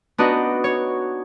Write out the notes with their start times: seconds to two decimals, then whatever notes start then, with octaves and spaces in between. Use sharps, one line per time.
0.18 B3 D4 D#4 F#4
0.64 C#5